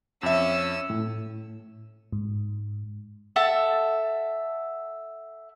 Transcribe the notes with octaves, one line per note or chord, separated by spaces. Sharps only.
F2 C#4 E5 E6
A2
G#2
A4 E5 F#5 A5